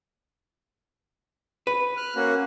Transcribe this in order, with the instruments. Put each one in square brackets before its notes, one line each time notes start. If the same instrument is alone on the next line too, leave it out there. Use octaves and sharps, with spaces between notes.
[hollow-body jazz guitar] B4
[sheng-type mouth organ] F6 F#6
A#3 C#4 F#4